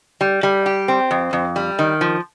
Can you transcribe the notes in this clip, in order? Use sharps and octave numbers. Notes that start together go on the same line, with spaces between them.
G3
G3
G4
C4
F2
F2
G3
D#3
F3